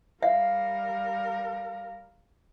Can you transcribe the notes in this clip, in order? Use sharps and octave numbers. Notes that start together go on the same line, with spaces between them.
G3 A#4 E5 F5